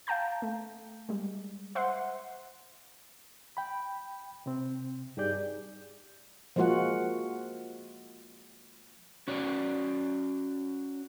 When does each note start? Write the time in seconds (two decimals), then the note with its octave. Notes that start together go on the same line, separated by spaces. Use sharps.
0.07 F5 G5 A5 A#5 G6
0.42 A3
1.09 G3 G#3
1.75 C5 E5 F#5 C6
3.57 G5 B5
4.46 C3 C4
5.17 G2 D#4 G4 G#4 D5 G6
6.56 F3 G#3 A#3 F4 F#4 F#5
9.28 C#4 F#4 C#5 D5